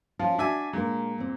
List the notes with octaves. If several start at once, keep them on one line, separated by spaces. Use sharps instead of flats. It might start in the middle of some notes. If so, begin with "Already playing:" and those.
F3 C#4 F4
D4 F#4 E5 G#5
A#2 G#3 D4 A#4
E2 C4